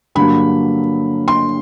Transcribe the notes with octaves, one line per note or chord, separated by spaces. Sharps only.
G2 D3 F#3 A#3 B5
C6